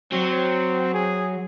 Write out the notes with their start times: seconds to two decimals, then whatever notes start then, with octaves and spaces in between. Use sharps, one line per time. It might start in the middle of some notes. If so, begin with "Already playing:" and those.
0.12 F#3 C4
0.94 G#4